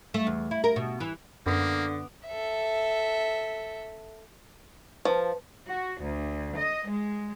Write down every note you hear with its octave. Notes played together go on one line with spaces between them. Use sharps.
A3
E2
E4
A#4
B2
E3
F#2 D3 A#3 B3 D6
A4 E5
F3 B4 A5
F#4
D2
D#5
G#3